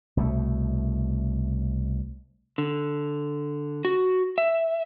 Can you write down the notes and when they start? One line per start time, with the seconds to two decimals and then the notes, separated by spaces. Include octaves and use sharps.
0.17 C2 B2 D#3 A3
2.58 D3
3.85 F#4
4.38 E5